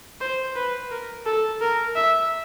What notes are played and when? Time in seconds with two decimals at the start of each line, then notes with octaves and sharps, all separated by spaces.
0.21 C5
0.56 B4
0.91 A#4
1.26 A4
1.61 A#4
1.96 E5